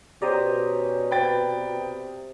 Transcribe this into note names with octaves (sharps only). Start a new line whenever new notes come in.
B2 C#4 G4 C5 D5 A#5 D#6
C3 B4 G5 A6